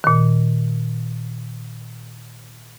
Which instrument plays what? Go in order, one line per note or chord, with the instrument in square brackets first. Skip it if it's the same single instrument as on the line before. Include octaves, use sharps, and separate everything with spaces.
[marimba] A#2 D#3